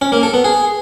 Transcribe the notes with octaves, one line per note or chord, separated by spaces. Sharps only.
C#4
A#3
A4
B3
G#4